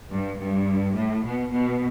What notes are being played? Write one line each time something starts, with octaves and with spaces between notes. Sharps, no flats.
G2
G2
A2
B2
B2